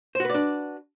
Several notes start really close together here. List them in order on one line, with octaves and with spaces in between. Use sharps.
C5 F#4 B4 D5 D4